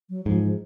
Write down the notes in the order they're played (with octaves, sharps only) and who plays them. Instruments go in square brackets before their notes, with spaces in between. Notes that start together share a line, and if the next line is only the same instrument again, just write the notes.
[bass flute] F#3
[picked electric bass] G#2 [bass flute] F3
[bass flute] F3